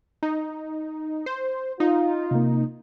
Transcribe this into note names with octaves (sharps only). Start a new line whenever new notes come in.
D#4
C5
D#4 F4
C3 A#3